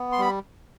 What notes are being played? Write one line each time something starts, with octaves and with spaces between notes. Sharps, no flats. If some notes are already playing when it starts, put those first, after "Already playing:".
Already playing: B3
C6
G3 B5